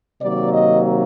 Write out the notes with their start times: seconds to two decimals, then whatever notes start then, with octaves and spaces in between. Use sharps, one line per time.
0.21 C3 D#3 F#3 A#3 D5
0.51 D#5